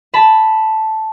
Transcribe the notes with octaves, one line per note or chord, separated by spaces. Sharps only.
A5 B5